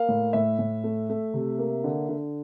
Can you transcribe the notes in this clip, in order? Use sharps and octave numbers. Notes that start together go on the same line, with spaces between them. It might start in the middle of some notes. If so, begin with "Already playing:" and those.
Already playing: A#3 F5
A2
A2 E5
A2
A3
A3
C3
A#3
D3
D3